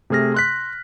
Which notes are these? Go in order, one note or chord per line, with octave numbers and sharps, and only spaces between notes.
C3 A3 G#4 F6 A#6
C6 F#6 B6